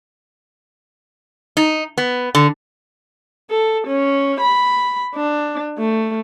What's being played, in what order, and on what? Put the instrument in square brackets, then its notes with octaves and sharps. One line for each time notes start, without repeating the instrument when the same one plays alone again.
[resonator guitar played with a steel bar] D#4
B3
D3
[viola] A4
C#4
B5
D4
A3